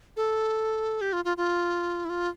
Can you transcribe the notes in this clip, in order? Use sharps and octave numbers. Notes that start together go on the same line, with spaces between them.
A4
G4
F4
F4
F4
E4
F4